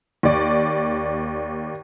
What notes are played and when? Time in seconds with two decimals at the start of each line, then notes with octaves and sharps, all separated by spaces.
0.23 D#2 D5